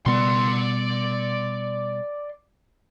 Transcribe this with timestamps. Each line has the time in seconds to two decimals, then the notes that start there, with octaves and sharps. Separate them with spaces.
0.06 B2 G3 B3 D5 C6